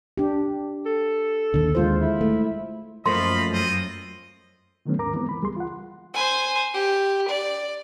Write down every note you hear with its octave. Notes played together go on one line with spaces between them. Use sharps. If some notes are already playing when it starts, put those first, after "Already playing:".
D4 G4
A4
D#2 D3
G#3 F4 C5
E4
A3
F#2 F3 A3 A#3 D#5 F5 B5 C6
C4 F4 D#5
D3 D#3 F#3 A3 B3 C#4
D#2 G#2 A#4 A#5 D6
E3 G#3 B3 C4
E3 B5
C#2 G3 G#4 C6
F4 F#5
C5 G#5
G4
D5